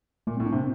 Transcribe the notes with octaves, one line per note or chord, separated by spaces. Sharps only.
A#2 A3
C4
A2
D4
C3
C4